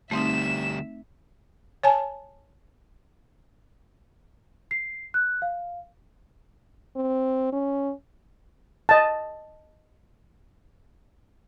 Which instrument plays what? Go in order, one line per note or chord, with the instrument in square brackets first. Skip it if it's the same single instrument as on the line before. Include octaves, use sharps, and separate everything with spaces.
[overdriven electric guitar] D2 G3 [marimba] A3 C4 D#4 [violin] E5 E7
[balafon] C#5 G#5 A5
[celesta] C7
F#6
F5
[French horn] C4
C#4
[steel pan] D#5 A5